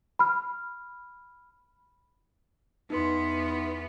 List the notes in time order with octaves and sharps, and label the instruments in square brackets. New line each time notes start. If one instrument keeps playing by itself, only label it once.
[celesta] B5 F6
[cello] E2 B3 [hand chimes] D#4 B4 C6